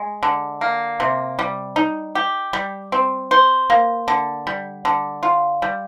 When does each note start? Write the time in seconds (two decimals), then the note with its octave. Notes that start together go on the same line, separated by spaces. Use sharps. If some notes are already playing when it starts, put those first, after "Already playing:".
Already playing: G#3
0.23 D3
0.61 A#3
1.00 C3
1.39 G3
1.76 D#4
2.15 G4
2.53 G3
2.92 C4
3.31 C5
3.70 A#3
4.08 D3
4.47 G3
4.85 D3
5.23 F4
5.62 G3